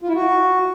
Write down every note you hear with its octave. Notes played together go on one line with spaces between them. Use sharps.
F4
E4
F#4